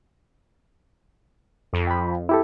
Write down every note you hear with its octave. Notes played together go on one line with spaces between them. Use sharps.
F2
G5 B5
E4 G4 A4